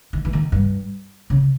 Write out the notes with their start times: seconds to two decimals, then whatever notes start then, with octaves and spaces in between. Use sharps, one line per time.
0.13 D#3
0.25 E3
0.33 D#3
0.52 G2
1.30 C#3